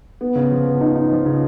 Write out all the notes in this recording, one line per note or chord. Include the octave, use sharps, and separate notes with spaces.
B3
C#3
F3
B3
D#4
D#4
F3
C#3